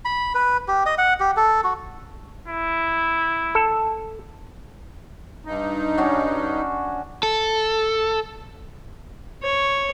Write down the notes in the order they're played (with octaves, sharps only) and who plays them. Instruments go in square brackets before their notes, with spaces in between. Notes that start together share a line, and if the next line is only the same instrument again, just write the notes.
[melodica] B5
B4
G4
D#5
F#5
G4
A4
F#4
[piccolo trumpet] E4
[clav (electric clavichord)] A4
[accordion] G2 D#4
[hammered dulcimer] C#4 D4 F#4
[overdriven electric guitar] A4
[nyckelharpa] C#5